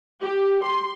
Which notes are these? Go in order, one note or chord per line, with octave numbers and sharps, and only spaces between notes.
G4
C6